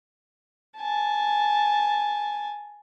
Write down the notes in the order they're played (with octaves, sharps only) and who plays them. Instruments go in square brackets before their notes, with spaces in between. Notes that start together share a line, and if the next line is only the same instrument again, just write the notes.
[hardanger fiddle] G#5 A5